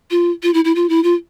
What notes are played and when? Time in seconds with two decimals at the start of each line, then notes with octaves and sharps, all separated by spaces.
0.11 F4
0.43 F4
0.54 E4
0.65 E4
0.75 F4
0.89 E4
1.04 F4